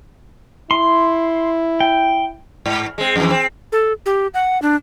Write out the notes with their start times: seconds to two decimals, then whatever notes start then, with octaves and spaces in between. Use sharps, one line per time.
0.71 E4 C6
1.80 G5
2.66 G#2
2.98 G#3 C4
3.16 F2 E3
3.31 C4
3.72 A4
4.06 G4
4.34 F#5
4.62 D4